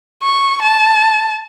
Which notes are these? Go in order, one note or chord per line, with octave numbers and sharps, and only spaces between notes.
C#6
A5